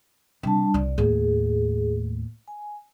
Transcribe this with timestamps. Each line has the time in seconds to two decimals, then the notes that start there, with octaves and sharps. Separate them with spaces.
0.43 C3 G3 D4 A5
0.74 C2 D5
0.98 D#2 A2 G#4
2.48 G#5